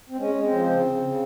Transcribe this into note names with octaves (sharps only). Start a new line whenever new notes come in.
C4
G#3 C#4
G#3
C4
F3
C#3
C#3
C#3